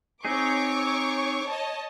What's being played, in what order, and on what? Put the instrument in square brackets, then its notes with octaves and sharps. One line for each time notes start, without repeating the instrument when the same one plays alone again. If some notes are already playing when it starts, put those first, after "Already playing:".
[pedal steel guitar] C4 D#4 G#4 [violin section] C#5 C#6 D6
[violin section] C#5 D#5 A5